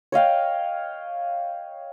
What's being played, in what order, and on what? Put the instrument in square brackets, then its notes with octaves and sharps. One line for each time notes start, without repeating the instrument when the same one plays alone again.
[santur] C#5 D#5 F5 G5